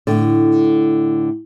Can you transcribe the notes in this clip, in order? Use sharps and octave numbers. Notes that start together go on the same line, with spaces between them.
A2 D3